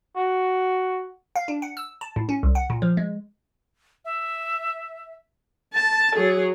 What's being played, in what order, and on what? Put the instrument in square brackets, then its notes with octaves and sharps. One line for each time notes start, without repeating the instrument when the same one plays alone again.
[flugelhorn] F#4
[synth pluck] F5
D4
F#5
E6
A5
A2
C#4
C2
F#5
A#2
F3
G#3
[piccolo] E5
[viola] A5 [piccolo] A6
[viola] F#3 G#4